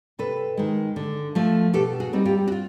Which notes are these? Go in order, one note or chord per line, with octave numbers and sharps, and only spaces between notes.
C3 A4 B4
D#3 G#3
D3
F3 A3
B2 G4 A4
F#4 G#4
G3 C4 D#4
F4 G4
F#4
F4